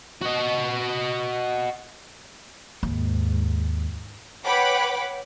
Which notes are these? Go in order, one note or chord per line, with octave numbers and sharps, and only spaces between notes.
F#4 D#5
D#2 G#2
B4 C#5 F#5 G5 B5 D6